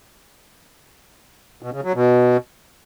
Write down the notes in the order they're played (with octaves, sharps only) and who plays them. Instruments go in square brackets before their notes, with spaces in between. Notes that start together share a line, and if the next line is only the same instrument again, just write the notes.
[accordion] B2
C#3
F#3
B2